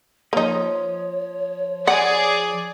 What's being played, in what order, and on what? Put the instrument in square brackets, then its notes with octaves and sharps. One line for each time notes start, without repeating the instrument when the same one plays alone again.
[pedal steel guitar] F3 D#5 [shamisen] A#3 D#4 [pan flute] C#5
[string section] G#4 D5 [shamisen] F#5